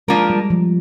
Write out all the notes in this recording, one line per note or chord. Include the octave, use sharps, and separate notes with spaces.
F3 G#3 A#3 D4 F4 A#4
G3
F3